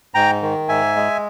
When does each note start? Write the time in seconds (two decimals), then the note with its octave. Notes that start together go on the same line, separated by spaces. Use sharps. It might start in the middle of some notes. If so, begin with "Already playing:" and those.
0.14 G#2 G5 A#5
0.42 D#3
0.69 G#2 E5 G#5
0.96 G#3